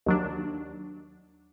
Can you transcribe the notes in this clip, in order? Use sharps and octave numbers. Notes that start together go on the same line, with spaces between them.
D#2 F#3 D4